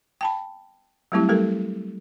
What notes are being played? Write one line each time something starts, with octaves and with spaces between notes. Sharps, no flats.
G5 A5 B5
F#3 G3 A3 C4 E4 G4
G3 A3 G4 A4 A#4